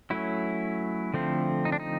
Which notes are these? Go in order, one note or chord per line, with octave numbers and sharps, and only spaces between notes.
F#3 A3 C#4 E4
D3 F3 A3 C4
D#4
D4
D#4